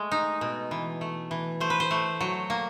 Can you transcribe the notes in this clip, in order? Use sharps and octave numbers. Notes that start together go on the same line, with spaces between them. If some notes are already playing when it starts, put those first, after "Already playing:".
Already playing: G#3 A3
D#4
B2
E3
A3
E3
A3 C5
B4
C5
A3
F#3
A#3